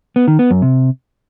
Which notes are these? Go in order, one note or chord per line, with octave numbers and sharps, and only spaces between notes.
B3
D#3
B3
F#2
C3